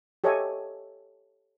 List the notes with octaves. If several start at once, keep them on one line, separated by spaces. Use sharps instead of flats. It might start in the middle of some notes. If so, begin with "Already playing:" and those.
G4 A4 C#5 D#5 E5 G#5